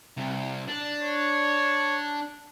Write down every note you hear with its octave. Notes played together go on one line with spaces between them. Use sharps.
C2
D4
C#5